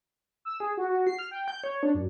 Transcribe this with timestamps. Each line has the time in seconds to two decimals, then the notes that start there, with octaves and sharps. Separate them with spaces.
0.45 E6
0.60 G#4
0.77 F#4
0.89 F#4
1.07 C7
1.19 F6
1.31 G5
1.48 G6
1.64 C#5
1.83 D4
1.95 F#2